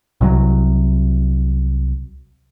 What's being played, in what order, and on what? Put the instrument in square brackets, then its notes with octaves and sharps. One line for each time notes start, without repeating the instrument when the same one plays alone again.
[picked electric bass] C2 C3 E3 F#3